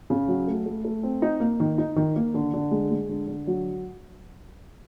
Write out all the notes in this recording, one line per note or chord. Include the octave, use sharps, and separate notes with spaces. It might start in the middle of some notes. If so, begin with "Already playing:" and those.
C#3
F#3
A3
A3
A3
C4
D#4
A#3
D#3
D#4
D#3
A#3
D3
D3
G#3
G#3
D3
D3
F#3